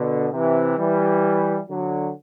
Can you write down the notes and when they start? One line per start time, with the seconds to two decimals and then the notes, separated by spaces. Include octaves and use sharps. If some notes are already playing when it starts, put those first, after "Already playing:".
Already playing: B2 D3
0.33 C3 E3
0.78 E3 G3
1.69 D3 F#3